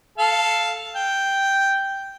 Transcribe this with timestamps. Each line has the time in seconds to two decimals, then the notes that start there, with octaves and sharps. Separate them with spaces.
0.18 A4 F5
0.95 G5